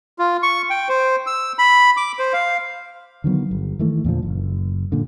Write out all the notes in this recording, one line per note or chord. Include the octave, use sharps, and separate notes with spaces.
F4
C#6
G5
C5
E6
B5
D6
C5
F5
D3 D#3 F#3 B3
G1
D#3 E3 A3
E2 A#2 D3 F3
F#1
A#2 D3